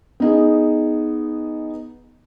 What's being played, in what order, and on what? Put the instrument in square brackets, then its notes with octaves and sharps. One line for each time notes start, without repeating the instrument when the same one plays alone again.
[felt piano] B3 D#4 G#4